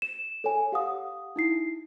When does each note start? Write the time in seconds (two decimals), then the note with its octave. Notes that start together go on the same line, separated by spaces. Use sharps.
0.02 E7
0.44 A4 C#5 G#5
0.72 G4 F5 F#5 D#6
1.36 D#4 E4 C7